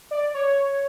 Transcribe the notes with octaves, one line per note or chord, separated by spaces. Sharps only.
D5
C#5